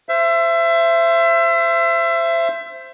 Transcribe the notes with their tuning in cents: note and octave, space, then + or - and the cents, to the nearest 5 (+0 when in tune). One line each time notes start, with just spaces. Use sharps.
C5 +0 E5 +30